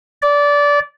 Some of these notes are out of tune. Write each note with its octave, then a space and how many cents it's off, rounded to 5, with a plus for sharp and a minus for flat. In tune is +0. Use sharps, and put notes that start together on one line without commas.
D5 -20